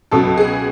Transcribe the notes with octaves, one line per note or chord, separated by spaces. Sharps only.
C#2 B2 F#3 A4
G#4